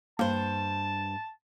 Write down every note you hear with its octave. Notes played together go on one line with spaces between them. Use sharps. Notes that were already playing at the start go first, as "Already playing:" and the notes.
G2 A#3 C5 A5